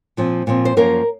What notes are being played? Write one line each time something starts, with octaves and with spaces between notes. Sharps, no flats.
A#2 F3 C4
A#2 F3 C4
C5
F#2 F3 A#3 C#4 A#4